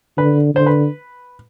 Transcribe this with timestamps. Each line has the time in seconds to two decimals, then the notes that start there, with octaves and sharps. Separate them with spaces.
0.17 D3 B4
0.55 D3 C5
0.66 B4